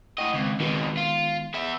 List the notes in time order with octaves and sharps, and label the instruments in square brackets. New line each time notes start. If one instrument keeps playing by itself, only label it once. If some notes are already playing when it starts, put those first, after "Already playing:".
[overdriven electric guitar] A2 D#5 [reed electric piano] F#5 G5 C#6
[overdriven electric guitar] C#2 [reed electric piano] D#3 C4
[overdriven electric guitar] F2 B2 [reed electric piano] D#3 G#3 B3
[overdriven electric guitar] F4
B3 E5